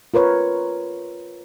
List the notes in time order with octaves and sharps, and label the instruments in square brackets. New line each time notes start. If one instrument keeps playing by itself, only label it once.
[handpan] F4 A#4 B4 C#5